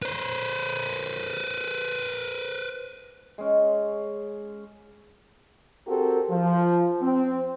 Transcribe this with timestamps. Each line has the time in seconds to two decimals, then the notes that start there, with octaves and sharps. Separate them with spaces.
0.02 B4 C5
3.38 G#3 C#4
5.88 C4 F#4 G4 A4 A#4
6.30 F3
7.02 C4